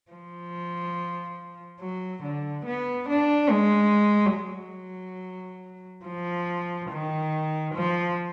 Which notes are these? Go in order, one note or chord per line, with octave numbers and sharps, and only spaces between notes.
F3
F#3
D3
B3
D4
G#3
F#3
F3
D#3
F3